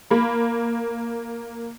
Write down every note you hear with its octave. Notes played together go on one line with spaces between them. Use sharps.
A#3 B5